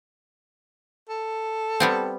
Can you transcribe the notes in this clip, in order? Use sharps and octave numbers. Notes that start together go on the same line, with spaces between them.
A4
G3 B3 C4